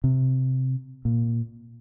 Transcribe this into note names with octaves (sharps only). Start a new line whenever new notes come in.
C3
A#2